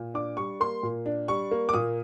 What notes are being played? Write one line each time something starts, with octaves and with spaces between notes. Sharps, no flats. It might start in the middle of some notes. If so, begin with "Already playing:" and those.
Already playing: A#2
D4 D6
G3 C#6
A#3 C6
A#2
D4
G3 C#6
A#3
D6
A#2 D#6